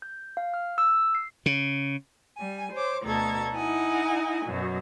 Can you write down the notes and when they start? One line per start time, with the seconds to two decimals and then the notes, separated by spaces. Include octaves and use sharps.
0.02 G6
0.37 F5
0.54 F6
0.78 E6
1.15 C7
1.46 C#3
2.37 G3 G#5
2.73 C5 C#5 D6
3.04 D2 B2 A4 A#5 G#6
3.54 D#4 E4 F#5 G#5
4.44 F#2 B2 F#3